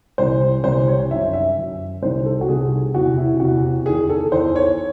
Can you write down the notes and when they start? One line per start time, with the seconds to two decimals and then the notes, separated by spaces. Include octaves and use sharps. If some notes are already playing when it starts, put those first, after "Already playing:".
0.18 C2 C3 E3 C5
0.64 C2 C3 E3 C5
0.88 C#5
1.11 F#2 D#3 E5
1.33 E5
1.57 F#2 D#3
2.02 C2 C3 D#3 C5
2.25 A4
2.41 F#4
2.48 C2 C3 D#3 G#4
2.94 E2 C3 E3 F#4
3.18 E4
3.40 E2 C3 E3 F#4
3.86 E2 D#3 G#4
4.10 A4
4.32 E2 D#3 C5
4.56 C#5